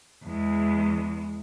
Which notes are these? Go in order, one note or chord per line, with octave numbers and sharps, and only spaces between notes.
E2 G#3